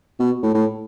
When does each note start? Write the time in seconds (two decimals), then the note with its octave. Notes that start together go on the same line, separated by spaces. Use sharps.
0.20 B2
0.43 A2
0.54 A2